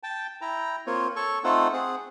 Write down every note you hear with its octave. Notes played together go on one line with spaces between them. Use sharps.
G5 A5
E4 G5 A#5
A#3 C4 F4 C#5
A4 C#5 C#6
A3 C4 D#4 F4 A4 F#5
C4 G#4 F#5